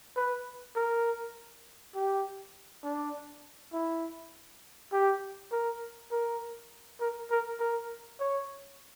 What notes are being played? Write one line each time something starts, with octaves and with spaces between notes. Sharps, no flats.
B4
A#4
G4
D4
E4
G4
A#4
A#4
A#4
A#4
A#4
C#5